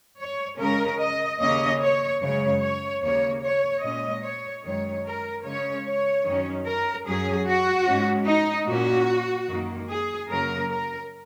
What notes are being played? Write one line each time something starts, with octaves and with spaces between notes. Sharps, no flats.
C#5
C#3 G#3 C#4 A#4
D#5
D#2 C#3 A#3 C#4 D#5
C#5
F#2 C#3 G#3 C#5
C#5
D#2 C#3 A#3 C#5
C#5
A#2 G#3 C#4 D#5
C#5
F#2 D#3 G#3 C#5
A#4
C#3 G#3 C#4 C#5
C#5
F#2 D#3 F#3 C#4
A#4
F#2 F#3 C#4 G#4
F#4
G#2 G#3 C#4
D#4
A#2 A#3 C#4 F#4
F#2 D#3 A#3
G#4
F#2 C#3 F#3 A#3 C#4 A#4
A#4